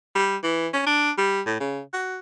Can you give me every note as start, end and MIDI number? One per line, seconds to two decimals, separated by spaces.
0.15 0.36 55
0.43 0.68 52
0.73 0.83 61
0.86 1.11 62
1.18 1.41 55
1.46 1.58 45
1.60 1.82 49
1.93 2.19 66